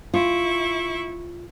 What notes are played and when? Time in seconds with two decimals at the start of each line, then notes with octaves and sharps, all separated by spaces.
0.14 E4 F4 C#6